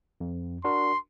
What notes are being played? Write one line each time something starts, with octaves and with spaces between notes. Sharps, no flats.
F2
D4 F#4 A#4 C6